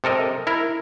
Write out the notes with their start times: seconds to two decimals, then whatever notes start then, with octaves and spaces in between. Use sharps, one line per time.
0.04 C3 A4 A#4 D#5
0.47 E4 A#4